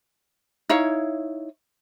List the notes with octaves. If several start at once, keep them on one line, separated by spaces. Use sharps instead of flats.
D#4 E4 C#5 F5